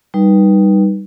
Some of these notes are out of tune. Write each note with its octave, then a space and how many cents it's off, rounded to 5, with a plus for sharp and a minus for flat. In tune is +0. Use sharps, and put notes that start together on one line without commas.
G3 +0 D#4 +0 B4 -25